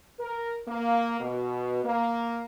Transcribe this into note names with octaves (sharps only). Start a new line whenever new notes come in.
A#4
A#3
B2
A#3